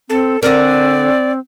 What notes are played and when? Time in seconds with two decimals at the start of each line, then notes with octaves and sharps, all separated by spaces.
0.10 C4 A4
0.43 D3 C4 A#4 D5